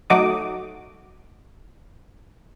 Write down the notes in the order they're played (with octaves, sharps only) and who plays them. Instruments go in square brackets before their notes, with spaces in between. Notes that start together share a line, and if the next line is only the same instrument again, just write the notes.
[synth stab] F#3 A3 D#4 F#4 D6 D#6